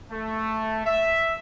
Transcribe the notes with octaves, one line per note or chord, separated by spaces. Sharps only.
A3
E5